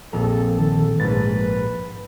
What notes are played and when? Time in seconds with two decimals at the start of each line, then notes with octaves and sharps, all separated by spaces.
0.13 A#1 F2 A4 A#5
0.59 D#3 A4
1.00 A#1 G#2 B4 A6